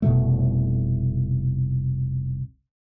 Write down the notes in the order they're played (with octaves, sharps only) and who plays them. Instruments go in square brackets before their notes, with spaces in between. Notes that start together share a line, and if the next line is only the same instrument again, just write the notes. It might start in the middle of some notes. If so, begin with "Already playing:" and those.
[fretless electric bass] F1 C2 B2 A3